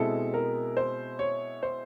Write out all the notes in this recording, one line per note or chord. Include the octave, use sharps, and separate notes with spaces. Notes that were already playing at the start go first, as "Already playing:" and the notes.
Already playing: B2 G#3 C4 E4 A4
A#4
C5
C#5
C5